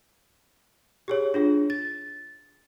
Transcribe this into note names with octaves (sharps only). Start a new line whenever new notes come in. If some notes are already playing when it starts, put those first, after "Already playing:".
G4 G#4 C#5
D4 F4 G#4
A6